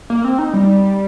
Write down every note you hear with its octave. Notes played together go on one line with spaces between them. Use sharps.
A#3
C4
D#4
G3